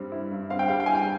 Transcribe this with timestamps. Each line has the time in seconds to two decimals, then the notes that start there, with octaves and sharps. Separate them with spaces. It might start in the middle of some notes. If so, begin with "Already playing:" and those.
Already playing: G2 G3 C4
0.12 E4
0.31 G2
0.50 C4 F5
0.59 G5
0.68 G3 F5
0.80 G5
0.86 E4 G#5
0.95 G5